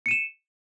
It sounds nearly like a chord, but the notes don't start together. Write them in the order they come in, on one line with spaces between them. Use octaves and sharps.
C#7 D#7 E7